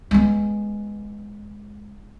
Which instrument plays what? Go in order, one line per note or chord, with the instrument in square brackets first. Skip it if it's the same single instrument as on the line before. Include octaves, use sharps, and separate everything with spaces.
[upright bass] G#3 B3